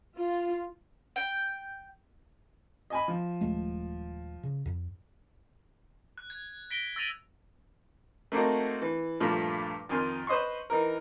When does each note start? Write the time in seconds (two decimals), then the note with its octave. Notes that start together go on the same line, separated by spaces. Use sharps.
0.16 F4
1.16 G5
2.90 D#5 G#5 B5
3.08 F3
3.41 D#1 G#3 A3
4.43 C#3
4.66 F2
6.18 F#6
6.30 G#6
6.71 A#6 B6 D7 G7
6.96 E6 A6 A#6 D#7 F7
8.32 A3 A#3 C4 D#4 F#4
8.82 E3
9.20 G2 A#2 F3 A3
9.89 F2 D#3 G#5 C6 F6
10.27 B4 C5 D#5 C6 C#6
10.70 E3 D#4 A#4